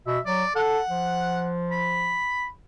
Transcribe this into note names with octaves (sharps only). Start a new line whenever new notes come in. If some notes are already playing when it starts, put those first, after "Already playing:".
B2 E5
F#3 D5
A4 F#5
F3
B5